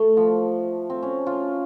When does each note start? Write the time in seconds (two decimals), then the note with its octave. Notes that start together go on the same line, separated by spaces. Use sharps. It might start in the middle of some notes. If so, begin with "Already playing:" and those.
Already playing: A3
0.17 F3
0.90 C4
1.03 C#4
1.27 F4